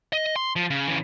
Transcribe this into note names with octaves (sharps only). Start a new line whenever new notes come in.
D#5
C6
F3
C#3
C#3 E3